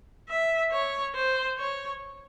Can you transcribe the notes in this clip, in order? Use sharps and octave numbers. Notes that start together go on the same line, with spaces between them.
E5
C#5
C5
C#5